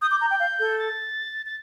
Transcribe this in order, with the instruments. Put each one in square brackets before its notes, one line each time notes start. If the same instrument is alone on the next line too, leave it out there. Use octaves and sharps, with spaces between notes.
[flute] D#6 [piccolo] G6
[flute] D6
A#5
G5
F5
A4
[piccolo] A6
A6